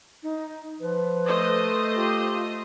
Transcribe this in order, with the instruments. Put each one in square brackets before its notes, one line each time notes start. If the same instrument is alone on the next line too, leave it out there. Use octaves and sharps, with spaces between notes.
[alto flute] D#4
[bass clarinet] F3 [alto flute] B4
[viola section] A3 C5 D#5
[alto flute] F4 [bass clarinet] G4